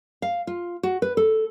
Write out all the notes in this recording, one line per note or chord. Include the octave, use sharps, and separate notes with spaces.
F5
F4
F#4
B4
A4